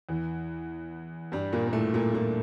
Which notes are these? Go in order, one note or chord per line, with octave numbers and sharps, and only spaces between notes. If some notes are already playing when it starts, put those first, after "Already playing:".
E2 E3
G2 G3
A#2 A#3
A#3
A2 A3
A#2 A#3
A#2 A#3